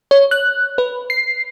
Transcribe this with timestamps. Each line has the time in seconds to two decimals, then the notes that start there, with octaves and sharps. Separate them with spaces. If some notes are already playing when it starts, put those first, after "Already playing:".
0.11 C#5
0.31 F#6
0.78 B4
1.10 C7